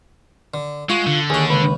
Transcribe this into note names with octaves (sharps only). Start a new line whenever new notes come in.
D3
G#3 F4 F#4
D3
D#2 F#4 G#4
C#2 B4